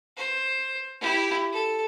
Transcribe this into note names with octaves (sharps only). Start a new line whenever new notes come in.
C5
E4 G4
A4